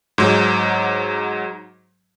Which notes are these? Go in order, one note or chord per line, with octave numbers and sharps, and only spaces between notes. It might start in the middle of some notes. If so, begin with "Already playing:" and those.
G#2 F#3